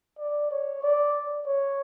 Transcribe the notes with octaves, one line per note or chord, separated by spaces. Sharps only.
D5
C#5
D5
C#5